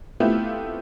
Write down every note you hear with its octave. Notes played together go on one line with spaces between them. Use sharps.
A3 B3 C4 E4 F4 G4